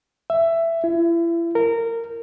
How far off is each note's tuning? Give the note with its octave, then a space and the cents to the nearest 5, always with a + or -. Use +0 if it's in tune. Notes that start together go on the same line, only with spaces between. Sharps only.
E5 +15
E4 +35
A#4 -20